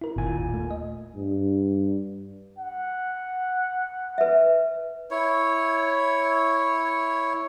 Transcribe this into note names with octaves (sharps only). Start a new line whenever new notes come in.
E4 A#4
G1 D#2 A#2 G#5
A3
D#5
G2
F#5
B4 E5
E4 C#5